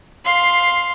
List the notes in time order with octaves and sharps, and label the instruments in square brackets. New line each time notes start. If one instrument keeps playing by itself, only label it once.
[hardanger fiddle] F5 C6